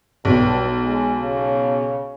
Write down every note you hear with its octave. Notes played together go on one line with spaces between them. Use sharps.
B1 G2
G#3
C#3